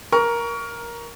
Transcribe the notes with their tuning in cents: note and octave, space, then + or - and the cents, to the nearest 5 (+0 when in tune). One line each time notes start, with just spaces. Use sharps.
A#4 +10 C#6 +25